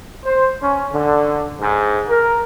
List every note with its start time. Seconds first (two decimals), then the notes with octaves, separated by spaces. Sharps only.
0.25 C5
0.62 C#4
0.93 D3
1.60 G#2
2.09 A#4